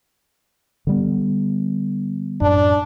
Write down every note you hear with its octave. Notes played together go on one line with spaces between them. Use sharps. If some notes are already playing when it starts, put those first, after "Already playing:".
D3 G3 B3
F#2 A2 D4